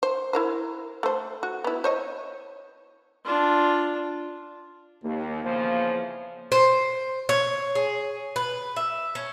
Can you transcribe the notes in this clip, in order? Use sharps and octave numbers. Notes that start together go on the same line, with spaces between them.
C5
E4 A#4 C5
A3 C5
F#4
B3 E4
C5 C#5 D#5
D4 F4
D#2 A#3
E2 C#3 F3
C5
C#5
G#4
B4
E5
C#4